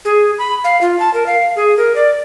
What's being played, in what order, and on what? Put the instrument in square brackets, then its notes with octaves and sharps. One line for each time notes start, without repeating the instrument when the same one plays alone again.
[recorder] G#4
B5
F5
F4
A5
A#4
F5
G#4
A#4
D5